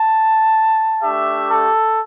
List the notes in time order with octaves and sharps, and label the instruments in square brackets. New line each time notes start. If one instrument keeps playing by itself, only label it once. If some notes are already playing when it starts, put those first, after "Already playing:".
Already playing: [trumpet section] A5
A3 D4 G4 E5
A4